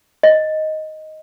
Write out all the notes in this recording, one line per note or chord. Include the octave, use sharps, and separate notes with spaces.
D#5